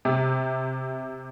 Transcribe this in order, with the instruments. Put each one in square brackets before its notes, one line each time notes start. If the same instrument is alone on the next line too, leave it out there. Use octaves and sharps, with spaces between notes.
[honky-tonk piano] C3